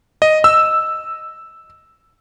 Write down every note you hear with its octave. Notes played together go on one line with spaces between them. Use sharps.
D#5
E6